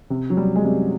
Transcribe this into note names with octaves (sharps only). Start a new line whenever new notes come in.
C3
F#3
C3 G3
G#3
C3 G3